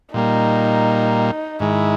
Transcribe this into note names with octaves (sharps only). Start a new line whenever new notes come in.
A#2 G3 A#3 D#4
G#2 D#3 G#3 E4